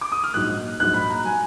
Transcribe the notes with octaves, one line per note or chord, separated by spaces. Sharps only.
D6
D#6
F6
A#1 G#2 F#3 F#6
A#1 G#2 F#3 F#6
B5
A#5
F#3 G#5